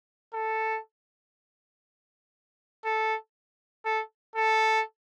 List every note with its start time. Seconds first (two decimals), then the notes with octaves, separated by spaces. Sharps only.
0.33 A4
2.84 A4
3.85 A4
4.35 A4